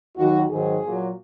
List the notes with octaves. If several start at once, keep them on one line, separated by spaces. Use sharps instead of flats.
D#2 D#3 F#3 F#4
G#2 D#3 F#3 G#4
A#2 F#3